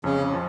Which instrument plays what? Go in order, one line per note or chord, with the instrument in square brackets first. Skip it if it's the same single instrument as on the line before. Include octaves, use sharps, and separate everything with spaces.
[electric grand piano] F2 [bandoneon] C#3 C#4
[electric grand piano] F3